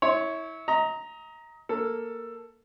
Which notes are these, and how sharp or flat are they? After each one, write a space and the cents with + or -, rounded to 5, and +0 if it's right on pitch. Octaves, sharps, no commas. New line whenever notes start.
E4 -25 C#5 +5
D#5 +30 A#5 +0
A#3 +0 A4 +10